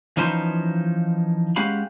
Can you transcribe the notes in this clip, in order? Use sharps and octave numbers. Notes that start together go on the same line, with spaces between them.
E3 F3 C#4 D#4 B4 C5
G#3 C#4 F#4 G4 F5 B5